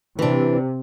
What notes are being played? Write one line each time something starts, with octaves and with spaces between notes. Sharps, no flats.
C3 E3 D4